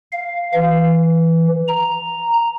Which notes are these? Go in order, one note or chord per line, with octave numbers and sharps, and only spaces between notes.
F5
E3
A#5